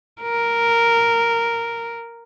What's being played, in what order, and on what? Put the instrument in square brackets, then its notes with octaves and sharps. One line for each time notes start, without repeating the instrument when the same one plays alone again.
[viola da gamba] A#4